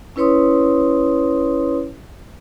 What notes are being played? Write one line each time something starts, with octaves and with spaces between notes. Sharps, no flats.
C#4 E4 B4 C#5 C6 D#6